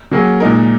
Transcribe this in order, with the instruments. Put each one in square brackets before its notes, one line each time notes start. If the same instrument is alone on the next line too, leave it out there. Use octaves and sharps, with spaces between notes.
[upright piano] F#3 A#3 C#4 G#4
A#2 G#3 D#4 A#4